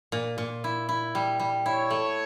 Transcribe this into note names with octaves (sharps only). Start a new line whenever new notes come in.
A#2
A#2
E4
E4
G3
G3
E4 C#5
A3